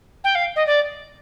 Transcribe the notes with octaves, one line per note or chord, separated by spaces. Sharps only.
G5
F5
D#5
D5